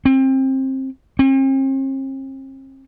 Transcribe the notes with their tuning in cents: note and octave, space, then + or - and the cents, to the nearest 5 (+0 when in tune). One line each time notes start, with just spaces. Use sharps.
C4 +25
C4 +45